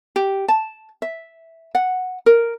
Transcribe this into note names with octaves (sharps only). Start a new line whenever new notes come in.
G4
A5
E5
F#5
A#4